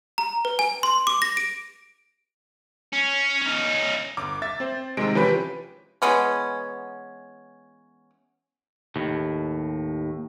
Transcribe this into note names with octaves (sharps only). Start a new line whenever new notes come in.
A#5
B4
G#5
C6
D6
A#6
D7
C#4
C#4 D#4
G1 D6
E5 A6
C4 C5
C3 D#3 G#3 C4 D7
E3 F3 C#4 G4 B4
E3 G#3 B3 C#4
D#2 A2